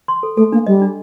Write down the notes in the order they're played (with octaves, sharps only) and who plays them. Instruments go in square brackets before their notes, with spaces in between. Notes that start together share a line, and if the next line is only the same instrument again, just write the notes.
[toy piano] C6
A4
[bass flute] A3 [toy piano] A4
[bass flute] A#3 [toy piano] D4
[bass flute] G3 [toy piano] D#5
[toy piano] D4